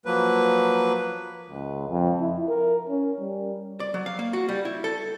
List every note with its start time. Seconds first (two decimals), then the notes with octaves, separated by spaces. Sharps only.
0.06 F3 F#3 A#3 B4
1.50 C#2
1.89 F2
2.21 E4
2.49 A#4
2.89 C#4
3.20 G3
3.80 D5
3.94 F#3
4.06 F5
4.19 A#3
4.33 F#4
4.48 G3
4.65 E4
4.84 A4